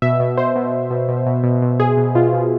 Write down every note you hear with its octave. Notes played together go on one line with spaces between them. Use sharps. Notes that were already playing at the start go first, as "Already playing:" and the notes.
B2 E5
B2
B2 C5
B2
B2
B2
B2
B2
B2
B2
B2 G#4
B2
B2 F4
B2